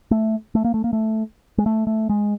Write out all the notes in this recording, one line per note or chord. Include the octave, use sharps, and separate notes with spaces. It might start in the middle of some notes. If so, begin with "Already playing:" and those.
A3
A3
A#3
A3
A#3
A3
G#3
A3
A3
G#3